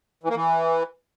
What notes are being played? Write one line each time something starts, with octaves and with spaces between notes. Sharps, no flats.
E3
A#3
E3